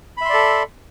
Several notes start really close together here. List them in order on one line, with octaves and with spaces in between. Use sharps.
B5 E5 C6 D5 A4